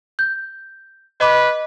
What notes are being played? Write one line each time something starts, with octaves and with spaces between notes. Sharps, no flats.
G6
B4 D#5 B5 D6